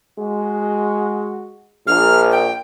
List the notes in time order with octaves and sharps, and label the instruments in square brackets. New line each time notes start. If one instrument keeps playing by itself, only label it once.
[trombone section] G#3 F#4
[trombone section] A#1 [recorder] F6
[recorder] G5